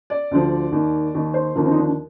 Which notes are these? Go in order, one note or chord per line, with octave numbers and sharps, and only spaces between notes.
D5
D2 D3 F3
D#2 D#3
D#2 D#3
C5
D#2 D3 F3 A#4
C4
D#4
D4
D4